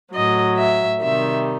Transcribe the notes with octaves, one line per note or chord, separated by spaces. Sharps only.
A2 F#3 D#5
E5
C3 D#3 G3 E5